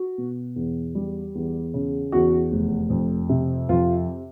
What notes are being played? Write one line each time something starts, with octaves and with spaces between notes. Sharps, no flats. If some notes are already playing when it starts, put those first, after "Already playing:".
Already playing: F#4
B2
E2
G3
E2
C#3
E2 F#4
F1
F2
C3
F2 F4